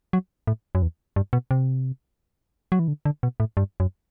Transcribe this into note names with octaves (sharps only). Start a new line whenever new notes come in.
F#3
A2
F#2
E2
G2
B2
C3
F#3
E3
D3
D3
B2
A2
G2
F#2